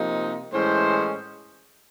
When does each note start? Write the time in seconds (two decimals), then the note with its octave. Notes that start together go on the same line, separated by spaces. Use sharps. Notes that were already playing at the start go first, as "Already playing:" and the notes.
Already playing: C3 F3 A#3 D#4
0.53 A2 E3 G#3 C#4 C5